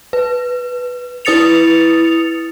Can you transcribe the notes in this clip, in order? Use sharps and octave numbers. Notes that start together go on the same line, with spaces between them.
B4
E4 B4 D#6 A6 C#7 F7